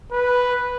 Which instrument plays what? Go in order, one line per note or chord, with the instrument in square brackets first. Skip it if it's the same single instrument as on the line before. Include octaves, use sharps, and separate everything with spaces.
[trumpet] B4